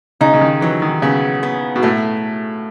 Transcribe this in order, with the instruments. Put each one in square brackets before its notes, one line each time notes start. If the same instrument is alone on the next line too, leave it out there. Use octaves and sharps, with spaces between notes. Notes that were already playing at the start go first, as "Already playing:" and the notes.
[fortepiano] C#3 [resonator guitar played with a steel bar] D#4
[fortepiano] C#3
D#3
[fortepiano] E3 [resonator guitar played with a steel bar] F#3
[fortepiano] D#3
[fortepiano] C#3 [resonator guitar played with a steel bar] B3
[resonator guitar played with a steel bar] B3
[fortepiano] B2
[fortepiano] A2 [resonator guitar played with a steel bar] A3